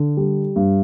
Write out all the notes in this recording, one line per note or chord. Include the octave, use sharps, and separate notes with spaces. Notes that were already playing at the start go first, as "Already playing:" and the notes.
Already playing: D3
G3
G2